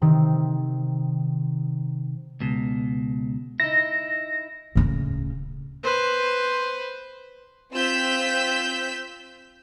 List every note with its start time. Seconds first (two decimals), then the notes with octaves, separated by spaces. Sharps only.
0.02 C3 D#3 D#4
2.40 C#2 B2
3.60 D#4 E4 A#6
4.75 D1 C#3
5.83 B4 C5
7.74 C4 F4 E6 G6 B6